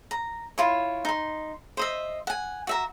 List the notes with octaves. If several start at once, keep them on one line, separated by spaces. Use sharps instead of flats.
A#5
E4 F4 C#5
D#4 C6
C5 D#5 E5
F#5 G#5
F#4 E5 A#5